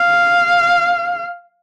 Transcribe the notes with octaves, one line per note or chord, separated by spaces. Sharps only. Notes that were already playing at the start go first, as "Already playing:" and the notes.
Already playing: F5